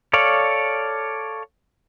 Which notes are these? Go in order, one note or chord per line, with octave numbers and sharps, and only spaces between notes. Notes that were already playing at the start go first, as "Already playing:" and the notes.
A4 C#5 D5 F5